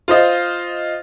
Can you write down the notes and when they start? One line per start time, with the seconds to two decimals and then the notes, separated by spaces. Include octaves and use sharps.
0.08 F4 C5 D#5